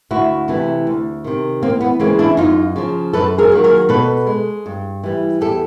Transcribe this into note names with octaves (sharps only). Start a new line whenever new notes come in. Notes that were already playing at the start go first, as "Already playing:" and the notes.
D2 E4 F#4
C3 E3 A3
D2
C3 D#3
E2 A#3 C4
B3
C#3 E3 G#3 A#3 C4
D4 E4
F#2 D#4 F4
C#3 F3
F#2 A4 B4
G#4 A#4
D#3 F#3 A#3
G#4 A#4
B2 A4 B4
G#3
G2
E3 G3
E2 G4 A4